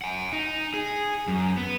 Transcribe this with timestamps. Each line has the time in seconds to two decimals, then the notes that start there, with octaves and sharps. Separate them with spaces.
0.02 F#5 G#5
0.33 D#4
0.74 G#4
1.28 F#2
1.57 B3